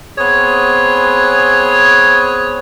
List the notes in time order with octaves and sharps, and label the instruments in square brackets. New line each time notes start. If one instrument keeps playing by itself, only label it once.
[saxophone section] B3 C4 G#4 C#5